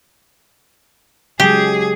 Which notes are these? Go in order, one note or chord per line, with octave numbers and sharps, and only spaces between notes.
C#3 F#3 G#3 G4 G#4